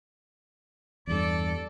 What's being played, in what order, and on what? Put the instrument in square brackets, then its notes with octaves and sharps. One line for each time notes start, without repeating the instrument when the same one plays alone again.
[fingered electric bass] E2 G2 [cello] A4 D5